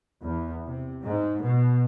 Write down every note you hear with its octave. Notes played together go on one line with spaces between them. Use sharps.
E2
C3
G#2
B2